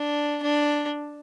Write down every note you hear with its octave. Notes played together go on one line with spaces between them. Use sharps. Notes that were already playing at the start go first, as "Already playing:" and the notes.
Already playing: D4
D4